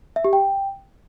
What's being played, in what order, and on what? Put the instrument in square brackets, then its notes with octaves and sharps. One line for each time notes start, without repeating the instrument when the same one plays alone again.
[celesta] E5
G4
G5